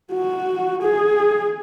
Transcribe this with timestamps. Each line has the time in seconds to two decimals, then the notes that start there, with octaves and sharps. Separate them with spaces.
0.13 F#4
0.83 G#4